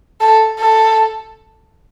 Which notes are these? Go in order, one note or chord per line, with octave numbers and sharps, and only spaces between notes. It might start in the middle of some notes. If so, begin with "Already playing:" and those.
A4
A4